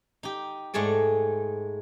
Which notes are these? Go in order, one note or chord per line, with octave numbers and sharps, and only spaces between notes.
D#4 G4
G#2 G#3 A3 G#4 D5